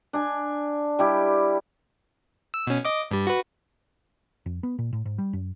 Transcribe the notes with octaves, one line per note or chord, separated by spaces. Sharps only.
D4 G#5
G3 E4 G4
E6
B2 C#4
D#5 D6
G2 G3
F#4 B4
F2
B3
A#2
A2
G#2
G3
F#2